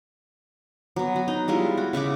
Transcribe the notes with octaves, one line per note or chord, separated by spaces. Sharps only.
F#3 B3
F#4
D#4
G3 G#3 E4 F4
F#4
C#3 E5 F#5 D6